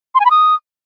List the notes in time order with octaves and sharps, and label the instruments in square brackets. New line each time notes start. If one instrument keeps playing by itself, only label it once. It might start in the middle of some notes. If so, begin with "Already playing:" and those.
[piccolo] C6
G#5
B5
D#6